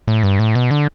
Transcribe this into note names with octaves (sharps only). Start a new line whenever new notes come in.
A2
G2
A2
B2
D3